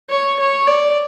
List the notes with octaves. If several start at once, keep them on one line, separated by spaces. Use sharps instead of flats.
C#5
C#5
D5